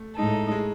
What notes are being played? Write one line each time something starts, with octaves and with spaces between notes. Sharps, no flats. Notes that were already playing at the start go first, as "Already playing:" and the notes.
Already playing: A3
A2 G#3 D#4 A4
G#3